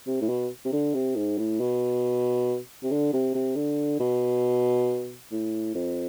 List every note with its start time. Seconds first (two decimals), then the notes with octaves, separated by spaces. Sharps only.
0.07 C3
0.21 A2
0.29 B2
0.65 C3
0.73 D3
0.95 C3
1.16 G#2
1.38 A2
1.60 B2
2.83 C3
2.91 D3
3.13 C3
3.35 C3
3.56 D3
4.00 B2
5.31 A2
5.75 F2